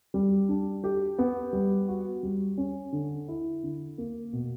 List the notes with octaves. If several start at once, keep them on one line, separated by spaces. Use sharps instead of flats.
G3
D4
G4
B3
G3
F#4
G3
C#4
D3
E4
D3
A#3
B2